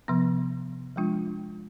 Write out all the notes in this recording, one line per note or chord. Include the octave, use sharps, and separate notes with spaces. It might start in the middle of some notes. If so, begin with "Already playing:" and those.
C3 F3 B3
F3 G#3 D4 F4